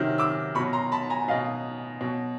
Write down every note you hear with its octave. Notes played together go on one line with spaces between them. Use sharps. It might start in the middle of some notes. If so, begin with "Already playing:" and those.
Already playing: C3 D#3 F#3 F6
D6 E6
B2 F#3 B5 C#6
A#5 C6
A5 B5
G#5 A#5
B2 F#3 D#5 F5
B2 F#3